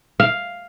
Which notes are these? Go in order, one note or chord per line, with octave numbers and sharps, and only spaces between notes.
F5